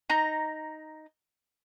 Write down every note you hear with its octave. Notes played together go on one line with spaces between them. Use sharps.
D#4 A#5